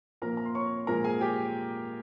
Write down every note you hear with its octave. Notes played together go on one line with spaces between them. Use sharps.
A#2 F3 A#3 A#4 A#5
A#5
C6
C#5 C#6
A#2 F3 G#3 A#4 A#5
G#4 G#5
G4 G5